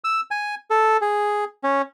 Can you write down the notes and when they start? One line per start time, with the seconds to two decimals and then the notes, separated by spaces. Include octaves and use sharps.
0.04 E6
0.31 G#5
0.71 A4
1.01 G#4
1.64 C#4